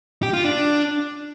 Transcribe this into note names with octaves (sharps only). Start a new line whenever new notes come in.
G4
F4
D4